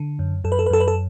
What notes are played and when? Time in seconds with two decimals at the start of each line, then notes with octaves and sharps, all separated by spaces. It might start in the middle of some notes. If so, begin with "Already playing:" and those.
Already playing: D3
0.19 F#2
0.44 F#2 A4
0.52 B4
0.59 A4
0.66 B4
0.70 F#2 A4
0.80 B4
0.88 A4